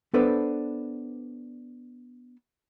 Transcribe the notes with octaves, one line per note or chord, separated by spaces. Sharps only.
B3 D4 A4 B4 C5 D5